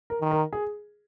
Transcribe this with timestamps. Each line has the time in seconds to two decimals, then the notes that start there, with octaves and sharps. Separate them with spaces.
0.10 A#4
0.21 D#3
0.31 A#4
0.53 G#4